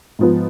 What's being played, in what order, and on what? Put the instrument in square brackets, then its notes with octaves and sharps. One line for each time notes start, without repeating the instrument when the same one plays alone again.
[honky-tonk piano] G#2 F3 B3